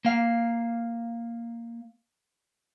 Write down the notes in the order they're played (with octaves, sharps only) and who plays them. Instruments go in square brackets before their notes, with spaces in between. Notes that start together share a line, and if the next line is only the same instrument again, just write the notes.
[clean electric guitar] A#3 F5